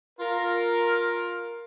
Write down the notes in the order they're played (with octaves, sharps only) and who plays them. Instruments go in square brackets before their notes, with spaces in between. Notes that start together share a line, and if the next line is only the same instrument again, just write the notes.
[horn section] F4 A#4